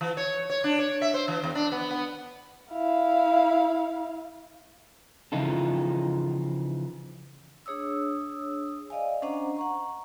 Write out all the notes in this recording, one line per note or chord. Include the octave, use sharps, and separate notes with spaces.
E3
C#5
C#5
D4
C#5
E5
C5
E3
E2
D4
B3
B3
E4 F5
C#3 E3 F3 D#4 F4 A4
D4 G#4 C#5 D#6 E6
D5 D#5 F5 G#5
C#4 D4 C5 D#5 F#5 A#5
F#5 A#5 C#6